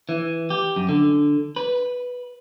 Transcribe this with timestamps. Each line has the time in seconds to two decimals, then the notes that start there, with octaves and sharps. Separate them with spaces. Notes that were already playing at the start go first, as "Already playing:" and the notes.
0.09 E3
0.50 G4
0.76 F#2
0.89 D3
1.56 B4